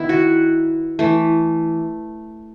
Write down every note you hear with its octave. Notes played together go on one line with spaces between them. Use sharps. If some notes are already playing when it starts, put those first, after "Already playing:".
Already playing: D#3 B3 E4
F#4
E3 A3